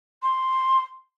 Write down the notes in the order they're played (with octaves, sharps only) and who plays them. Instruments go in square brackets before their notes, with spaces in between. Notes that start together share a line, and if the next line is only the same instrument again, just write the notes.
[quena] C6